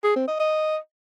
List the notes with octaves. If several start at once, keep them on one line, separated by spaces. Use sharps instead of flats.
G#4
C4
D#5
D#5